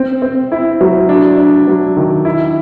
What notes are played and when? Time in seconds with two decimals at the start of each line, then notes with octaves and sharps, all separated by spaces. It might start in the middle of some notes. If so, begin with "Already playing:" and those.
Already playing: C4
0.22 C4
0.52 E4
0.81 F#3
1.09 D4
1.38 D4
1.67 F#3
1.97 D#3
2.25 E4